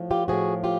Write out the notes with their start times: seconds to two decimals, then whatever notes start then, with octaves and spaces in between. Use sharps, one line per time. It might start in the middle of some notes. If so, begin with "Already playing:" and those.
Already playing: A2 F3
0.11 F4 G4
0.28 A2 F3 F#4 G#4
0.64 F4 G4